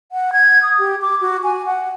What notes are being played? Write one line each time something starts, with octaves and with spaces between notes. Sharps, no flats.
F#5
G#6
D#6
G4
D6
F#4
G#5
F#5